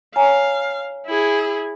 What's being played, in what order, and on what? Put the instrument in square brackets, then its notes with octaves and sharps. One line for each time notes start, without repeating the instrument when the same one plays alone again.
[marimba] C#5 G#5 A#5 [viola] F5
[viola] E4 G#4